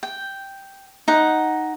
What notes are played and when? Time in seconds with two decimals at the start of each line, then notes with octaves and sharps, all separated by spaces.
0.03 G5
1.08 D#4 F#5